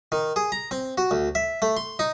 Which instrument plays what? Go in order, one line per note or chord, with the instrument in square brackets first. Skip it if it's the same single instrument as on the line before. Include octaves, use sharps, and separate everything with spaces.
[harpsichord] D#3
G#4
A#5
C4
F#4
D2
E5
A3
C6
D#4